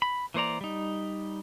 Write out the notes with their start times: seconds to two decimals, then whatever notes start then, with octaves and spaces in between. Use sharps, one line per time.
0.02 B5
0.34 E3 A#3 C5 D5 A#5
0.61 G3 D#4